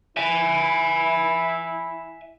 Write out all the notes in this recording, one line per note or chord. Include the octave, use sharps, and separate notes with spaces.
E4 E5 G#5